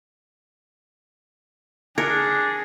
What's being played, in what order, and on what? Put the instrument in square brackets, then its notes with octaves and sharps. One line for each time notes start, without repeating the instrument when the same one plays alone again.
[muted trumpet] D4 [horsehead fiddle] G#4 [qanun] A#4 [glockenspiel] G#6 A#6 C#7